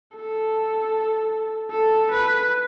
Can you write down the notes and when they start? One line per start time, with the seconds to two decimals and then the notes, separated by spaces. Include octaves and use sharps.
0.16 A4
1.71 A4
2.11 B4